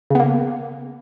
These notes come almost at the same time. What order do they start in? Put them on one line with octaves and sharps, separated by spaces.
C#3 B3 A#3